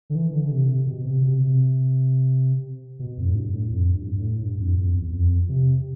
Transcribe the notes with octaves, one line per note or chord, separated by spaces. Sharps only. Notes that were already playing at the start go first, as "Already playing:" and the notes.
D3
E3
D3
D3
C3
C3
B2
C3
C3
C3
B2
F2
A2
G2
A2
F2
G2
A2
G2
F2
F2
E2
F2
C3